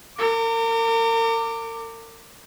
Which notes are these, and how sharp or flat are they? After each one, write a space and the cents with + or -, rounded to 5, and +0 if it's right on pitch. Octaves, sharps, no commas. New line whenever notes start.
A#4 -40 D6 +0